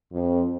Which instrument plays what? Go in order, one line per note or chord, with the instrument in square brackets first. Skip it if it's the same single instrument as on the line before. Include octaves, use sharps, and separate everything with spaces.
[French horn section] F2